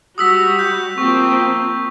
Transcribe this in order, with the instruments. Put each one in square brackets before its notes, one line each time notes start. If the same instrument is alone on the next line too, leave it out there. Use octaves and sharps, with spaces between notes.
[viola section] G3 F#4 [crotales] D#6 E6 B6
[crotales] G6
[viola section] F3 A#3 C4 [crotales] C#6